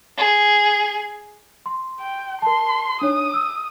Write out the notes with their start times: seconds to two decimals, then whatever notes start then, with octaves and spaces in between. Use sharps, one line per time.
0.18 G#4
1.66 C6
2.00 G5
2.42 A#4 A5 C6
3.01 D4 D#4 C#5 D#6
3.33 E6